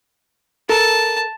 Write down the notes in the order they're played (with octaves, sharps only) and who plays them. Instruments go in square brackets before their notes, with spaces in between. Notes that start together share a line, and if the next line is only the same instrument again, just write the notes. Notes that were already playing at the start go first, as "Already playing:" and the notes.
[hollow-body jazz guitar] A4 A#4 [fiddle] A5